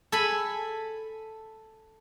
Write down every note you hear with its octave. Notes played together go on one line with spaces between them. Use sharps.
A4 G#5 B5